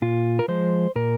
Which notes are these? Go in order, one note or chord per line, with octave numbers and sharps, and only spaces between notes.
A#2 F4
A#4
F3 G#3 C5
A#2 A#4